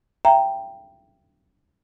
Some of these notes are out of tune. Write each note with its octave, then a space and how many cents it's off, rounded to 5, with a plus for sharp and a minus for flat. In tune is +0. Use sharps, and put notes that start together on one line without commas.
E5 +35 G5 +0 A#5 +0